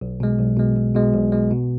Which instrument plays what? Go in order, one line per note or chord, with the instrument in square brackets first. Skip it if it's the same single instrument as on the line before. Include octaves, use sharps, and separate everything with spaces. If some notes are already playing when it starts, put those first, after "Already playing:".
[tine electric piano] B1
B2 G#3
B1
B2 G#3
B1
B2 G#3
B1
B2 G#3
B2